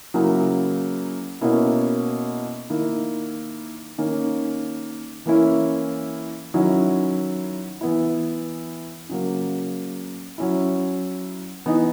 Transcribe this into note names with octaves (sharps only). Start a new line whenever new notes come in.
C#3 F#3 A#3 E4
B2 A#3 C#4 E4
D#3 A#3 E4
D#3 A#3 C#4
E3 A#3 C#4 E4
D#3 F#3 C#4 E4
E3 B3 E4
C#3 F#3 A#3
F#3 C#4 E4
E3 B3 D#4